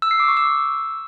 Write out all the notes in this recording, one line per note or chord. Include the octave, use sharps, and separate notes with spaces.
E6
C7
D6
C#6
E6